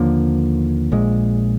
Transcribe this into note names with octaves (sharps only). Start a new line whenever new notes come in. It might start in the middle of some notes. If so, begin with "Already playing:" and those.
Already playing: D#2 D3 F3 A#3
A#1 A#2 G#3